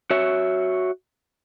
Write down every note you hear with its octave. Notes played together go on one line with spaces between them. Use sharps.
F#4 C#5 E5